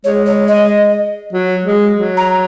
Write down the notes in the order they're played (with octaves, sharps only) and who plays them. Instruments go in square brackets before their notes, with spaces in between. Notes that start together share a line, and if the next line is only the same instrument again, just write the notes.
[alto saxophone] G#3 [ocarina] C#5
[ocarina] C#5
D#5
[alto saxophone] F#3
G#3
F#3
[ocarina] A#5